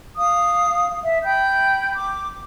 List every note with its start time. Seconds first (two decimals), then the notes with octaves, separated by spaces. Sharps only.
0.17 F5 D#6
1.05 E5
1.24 G5 B5 G6
1.95 D6